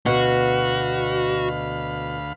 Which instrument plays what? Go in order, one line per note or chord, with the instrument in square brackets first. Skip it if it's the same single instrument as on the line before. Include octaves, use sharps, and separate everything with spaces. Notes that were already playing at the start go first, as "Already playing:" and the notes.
[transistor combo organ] D2 F5 B5 [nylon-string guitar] B2 [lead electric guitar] F#4